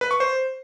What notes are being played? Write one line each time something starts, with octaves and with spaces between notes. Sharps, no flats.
B4
C#6
C5